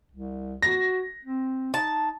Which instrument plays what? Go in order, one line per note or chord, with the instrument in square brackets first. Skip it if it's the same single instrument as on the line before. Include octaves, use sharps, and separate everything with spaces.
[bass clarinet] C2
[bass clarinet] F#4 [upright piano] A#6
[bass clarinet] C4
[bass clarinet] D#4 [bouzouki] A5